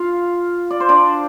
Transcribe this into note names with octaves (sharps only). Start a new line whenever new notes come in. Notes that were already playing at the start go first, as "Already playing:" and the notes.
Already playing: F4 F5
D5
C5
D4 D5